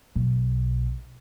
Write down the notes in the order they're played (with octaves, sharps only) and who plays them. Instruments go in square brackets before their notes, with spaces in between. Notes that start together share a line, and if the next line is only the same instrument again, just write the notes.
[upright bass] B1